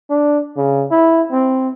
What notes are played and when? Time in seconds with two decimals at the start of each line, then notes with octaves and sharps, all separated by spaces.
0.10 D4
0.57 C#3
0.91 E4
1.32 C4